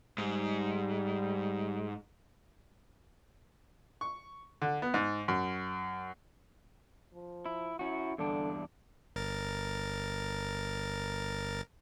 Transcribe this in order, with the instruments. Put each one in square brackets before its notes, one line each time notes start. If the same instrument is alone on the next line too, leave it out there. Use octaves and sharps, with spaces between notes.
[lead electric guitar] G#2 [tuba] G3
[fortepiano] C#6
D3
B3
G#2
F#2
[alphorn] F3
[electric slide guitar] E4
[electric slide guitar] C#4 F#4 [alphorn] E4
[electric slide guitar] E2 G2 D4 [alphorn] D3
[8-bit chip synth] G1 A#4 A6